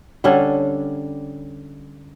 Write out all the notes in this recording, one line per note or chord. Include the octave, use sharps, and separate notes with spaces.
D3 G3 C#4 D4